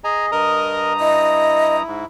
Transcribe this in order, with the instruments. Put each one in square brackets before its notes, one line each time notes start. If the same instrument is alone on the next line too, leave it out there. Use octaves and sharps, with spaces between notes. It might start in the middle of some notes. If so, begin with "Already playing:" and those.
[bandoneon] G#4 D#5 [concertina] G#5 A#5
[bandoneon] G2 A#5 D#6 [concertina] A#4 D#5
[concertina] E4 [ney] D#5
[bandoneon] G#2